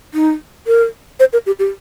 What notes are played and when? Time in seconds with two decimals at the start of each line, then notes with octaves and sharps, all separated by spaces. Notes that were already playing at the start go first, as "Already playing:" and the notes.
0.14 D#4
0.67 A#4
1.20 C5
1.33 A#4
1.46 G4
1.59 G4